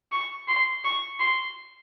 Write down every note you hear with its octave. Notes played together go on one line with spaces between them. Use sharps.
C#6
C6
C#6
C6